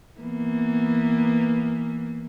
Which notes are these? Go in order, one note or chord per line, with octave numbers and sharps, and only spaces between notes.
E3 A#3 B3